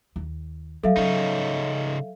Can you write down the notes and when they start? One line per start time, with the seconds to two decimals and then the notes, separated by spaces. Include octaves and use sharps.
0.16 D#2
0.83 F#3 A4 E5 F5
0.97 C#3 F#3 C#4 D#4